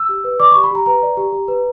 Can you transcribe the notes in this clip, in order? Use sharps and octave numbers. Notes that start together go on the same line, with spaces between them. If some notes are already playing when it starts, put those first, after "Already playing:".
Already playing: E6
G4
B4
D5 D6
G4 C#6
B5
G4 A#5
B4 A#5
D5
G4
G4
B4